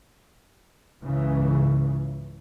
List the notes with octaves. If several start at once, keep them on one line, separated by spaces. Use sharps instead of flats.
C#2 G#2 C#3 E3